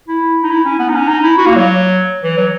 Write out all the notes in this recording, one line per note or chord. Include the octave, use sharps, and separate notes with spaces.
E4
D#4
E4
C#4
B3
D#4
C#4
D#4
E4
F#4
A#3
F#3
E3
F#3